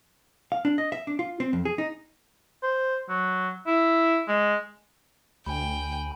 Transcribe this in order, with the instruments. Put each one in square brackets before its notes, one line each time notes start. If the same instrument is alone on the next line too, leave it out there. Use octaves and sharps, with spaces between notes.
[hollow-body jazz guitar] F5
D4
D#5
E5
D4
F4
C4
F2
G#4
D#4
[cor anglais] C5
F#3
E4
G#3
[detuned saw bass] D2 [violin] G5 [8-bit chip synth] G#5 B5